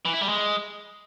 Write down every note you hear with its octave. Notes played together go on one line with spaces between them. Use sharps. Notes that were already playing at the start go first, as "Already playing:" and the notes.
E3
E4
G3
G#3